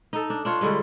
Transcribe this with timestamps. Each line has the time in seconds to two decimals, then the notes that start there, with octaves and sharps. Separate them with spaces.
0.13 D#4 A4
0.30 D4
0.45 D4 F4 C#5
0.61 D3 G3 G#3 C#4